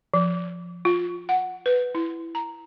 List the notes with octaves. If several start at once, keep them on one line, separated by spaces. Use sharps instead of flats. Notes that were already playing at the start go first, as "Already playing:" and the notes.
F3
F4
F#5
B4
E4
A#5